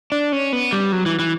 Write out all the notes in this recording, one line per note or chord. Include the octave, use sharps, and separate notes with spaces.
D4
C#4
B3
G3
F#3
E3
E3